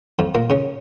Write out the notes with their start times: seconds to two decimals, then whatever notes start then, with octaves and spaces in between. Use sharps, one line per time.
0.19 F2 F3
0.35 A#2 A#3
0.50 C#3 C#4